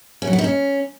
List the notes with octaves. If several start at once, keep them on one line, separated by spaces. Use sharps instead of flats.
C#4
F#3
B3
D#4
C#4